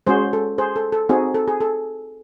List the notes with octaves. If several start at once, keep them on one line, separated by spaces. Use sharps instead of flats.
G#3 C#4 F#4 G#4 C5
A4
G#4 C5
A4
A4
C4 D#4 F#4 G#4
A4
G#4
A4